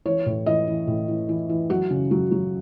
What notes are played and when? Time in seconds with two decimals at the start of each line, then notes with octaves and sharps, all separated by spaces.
0.06 E3 C#5
0.26 A2
0.46 E3 D#5
0.67 E3
0.87 A2
1.08 E3
1.29 E3
1.49 E3
1.70 F#3 F#4
1.91 C#3
2.11 F#3
2.31 F#3